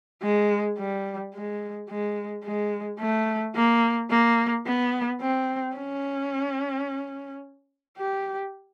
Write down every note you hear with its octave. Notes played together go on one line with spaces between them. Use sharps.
G#3
G3
G#3
G#3
G#3
A3
A#3
A#3
B3
C4
C#4
G4